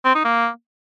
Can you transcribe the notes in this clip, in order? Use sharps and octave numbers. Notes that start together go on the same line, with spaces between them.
C4
D#4
A#3